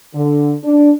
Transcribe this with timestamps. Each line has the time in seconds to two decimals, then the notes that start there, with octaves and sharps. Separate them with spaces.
0.15 D3
0.64 D4